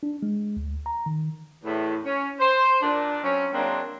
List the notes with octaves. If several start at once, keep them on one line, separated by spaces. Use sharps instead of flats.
D4
G#3
D2
A#5
D#3
E2 A2
C#4
C5
A#2 D4
F#3 C4 C#4
F#3 G#3 A#3 C4 D4